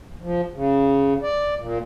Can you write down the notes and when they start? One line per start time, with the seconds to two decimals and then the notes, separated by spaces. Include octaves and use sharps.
0.20 F3
0.54 C#3
1.22 D5
1.59 A#2